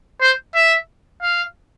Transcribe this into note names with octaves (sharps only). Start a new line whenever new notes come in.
C5
E5
F5